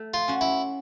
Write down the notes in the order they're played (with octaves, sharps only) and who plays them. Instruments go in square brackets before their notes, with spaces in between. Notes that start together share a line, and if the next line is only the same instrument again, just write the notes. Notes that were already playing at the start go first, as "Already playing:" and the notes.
Already playing: [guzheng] A3
[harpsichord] F4
[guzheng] C#4 F#4
[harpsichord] E4